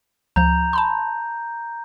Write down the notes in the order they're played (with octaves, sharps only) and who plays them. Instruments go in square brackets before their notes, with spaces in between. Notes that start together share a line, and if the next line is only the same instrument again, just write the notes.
[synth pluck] C#2 F3 [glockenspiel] A#5 G6
[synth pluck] A5 B5 C6